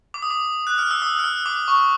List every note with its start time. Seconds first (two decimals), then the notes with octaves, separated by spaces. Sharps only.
0.14 D6
0.22 D#6
0.31 D6
0.67 F#6
0.78 F6
0.91 E6
1.02 D#6
1.19 F6
1.24 E6
1.46 D6
1.68 C#6